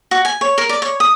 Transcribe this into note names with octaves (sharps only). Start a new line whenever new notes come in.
F#4
G#5
C#5
A#4
D5
C#5
D#6